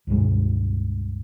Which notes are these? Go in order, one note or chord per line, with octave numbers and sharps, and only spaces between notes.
C#2 G2 B2 G#3